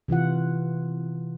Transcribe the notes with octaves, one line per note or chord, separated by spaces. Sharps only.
C3 E3 F4 F#5